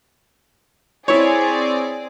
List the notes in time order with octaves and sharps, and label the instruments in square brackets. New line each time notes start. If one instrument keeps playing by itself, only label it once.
[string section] C4 G#4 D5 [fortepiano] E4 C#5